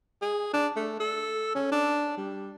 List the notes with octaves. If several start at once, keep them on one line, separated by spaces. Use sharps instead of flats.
G#4
D4
A3
A4
C#4
D4
G3